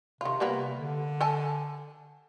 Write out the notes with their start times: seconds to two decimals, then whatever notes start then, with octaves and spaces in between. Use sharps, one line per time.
0.21 C3 D#3 F4
0.40 G3 A#3 B3
0.77 D3
1.21 A4 G#5 A5